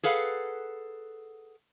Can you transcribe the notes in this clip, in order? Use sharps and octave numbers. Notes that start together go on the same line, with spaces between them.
G#4 A4 B4 F5 F#5